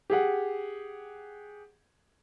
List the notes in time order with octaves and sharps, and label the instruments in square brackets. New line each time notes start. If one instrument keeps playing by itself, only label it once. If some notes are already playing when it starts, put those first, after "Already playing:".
[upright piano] G4 G#4 F#5